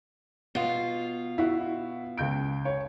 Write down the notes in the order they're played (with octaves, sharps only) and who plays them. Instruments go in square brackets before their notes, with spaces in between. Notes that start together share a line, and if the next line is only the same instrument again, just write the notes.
[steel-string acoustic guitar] B2 F4
[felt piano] E4 F#4
C#2 G6 D7
C#5